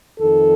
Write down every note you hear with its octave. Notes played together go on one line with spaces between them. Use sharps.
F2 D#3 A4